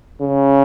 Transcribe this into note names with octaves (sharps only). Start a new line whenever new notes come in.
C#3